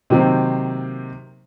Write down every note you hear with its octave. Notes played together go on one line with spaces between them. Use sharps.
C3 D#3 F#3 A#3 C4